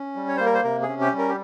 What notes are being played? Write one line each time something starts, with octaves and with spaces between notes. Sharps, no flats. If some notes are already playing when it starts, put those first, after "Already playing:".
Already playing: C#4
G3
C#5
A#3 C5
A#4
C5
C3 A#4
G#4
C#4
G4
G3
A#4
G4